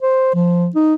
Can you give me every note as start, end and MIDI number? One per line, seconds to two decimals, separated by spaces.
0.02 0.34 72
0.34 0.69 53
0.75 0.94 63